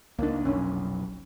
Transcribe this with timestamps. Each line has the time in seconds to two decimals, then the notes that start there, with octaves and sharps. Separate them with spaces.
0.19 C#2 A#3 D4 D#4
0.45 F1 B1 C#4